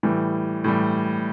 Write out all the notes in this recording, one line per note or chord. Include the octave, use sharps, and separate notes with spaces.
A2 E3 G3
A2 E3 G3